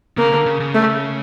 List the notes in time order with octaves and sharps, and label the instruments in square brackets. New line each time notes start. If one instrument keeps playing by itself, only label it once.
[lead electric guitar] C#3 [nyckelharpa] A#3
[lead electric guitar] D3
C#3
C#3
[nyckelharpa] A3